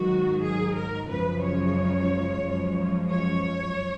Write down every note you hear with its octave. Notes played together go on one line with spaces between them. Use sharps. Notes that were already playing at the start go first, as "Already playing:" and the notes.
Already playing: G#2 D#3 F#3 F#4
G#4
A#4
F#2 C#3 F3 G#3 B4
C#5
F#2 F3 G#3
C#5